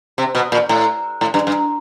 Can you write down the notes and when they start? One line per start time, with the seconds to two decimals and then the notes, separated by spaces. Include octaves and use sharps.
0.18 C3
0.35 B2
0.52 A#2
0.69 A2
1.21 A2
1.34 G2
1.47 G2